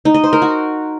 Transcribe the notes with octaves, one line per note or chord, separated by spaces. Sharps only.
D#4
D#5
C5
A#4
F#4